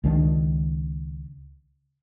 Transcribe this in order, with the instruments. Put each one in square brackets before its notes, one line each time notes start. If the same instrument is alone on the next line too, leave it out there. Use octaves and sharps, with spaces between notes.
[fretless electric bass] C#2 D#3 C#4 D4